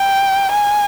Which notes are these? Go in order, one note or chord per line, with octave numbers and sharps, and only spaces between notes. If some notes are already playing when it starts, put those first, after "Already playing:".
Already playing: G5
G#5